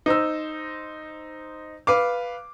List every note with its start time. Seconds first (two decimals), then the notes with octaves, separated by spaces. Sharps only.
0.06 D#4 C5 E6
1.87 B4 F5 D6